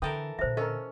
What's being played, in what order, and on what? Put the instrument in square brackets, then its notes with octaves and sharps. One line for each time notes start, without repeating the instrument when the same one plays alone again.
[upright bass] D3 [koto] E3 A4 A#4 [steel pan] G5 D#6
[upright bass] A#2 D3 [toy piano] C5 E5
[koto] C#4 [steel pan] A4 A#4 [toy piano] D#5